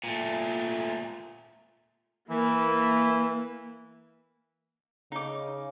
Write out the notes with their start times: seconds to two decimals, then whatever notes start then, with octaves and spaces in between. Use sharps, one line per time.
0.04 A#2 A3
2.30 E3 A#3 E4
5.12 C#3 D#4 D6